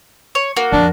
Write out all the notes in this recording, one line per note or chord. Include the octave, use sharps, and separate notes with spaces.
C#5
A#3 F#4
F2 D4